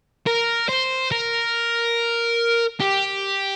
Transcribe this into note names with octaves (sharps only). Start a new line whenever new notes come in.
A#4
C5
A#4
G4